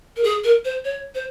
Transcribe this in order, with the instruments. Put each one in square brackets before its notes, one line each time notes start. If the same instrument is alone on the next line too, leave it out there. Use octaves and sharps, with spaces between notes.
[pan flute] A#4
G#4
A#4
C5
C#5
C5